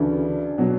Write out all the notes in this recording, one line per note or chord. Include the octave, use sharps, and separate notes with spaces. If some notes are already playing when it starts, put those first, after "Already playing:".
Already playing: D2 C#3 E3 D4
B2 F#3